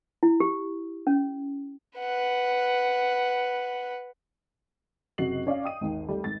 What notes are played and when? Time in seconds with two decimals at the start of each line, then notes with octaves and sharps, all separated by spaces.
0.23 E4
0.40 G4
1.07 C#4
1.98 B4 F#5
5.18 F#1 C3 F#4 D#5 C7 F#7
5.47 C#4 D5 D#5 F5
5.64 G5 D#6 D#7
5.81 G#1 D#2
6.09 G3 A3
6.24 G#1 A6